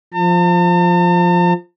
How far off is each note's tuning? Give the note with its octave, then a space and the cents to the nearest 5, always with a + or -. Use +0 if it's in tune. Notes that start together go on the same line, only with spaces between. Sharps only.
F3 +0 A5 +45